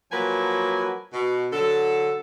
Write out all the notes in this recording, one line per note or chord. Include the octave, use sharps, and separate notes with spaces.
F3 F#3 A#3 B4 G#5
B2
D3 F#3 A4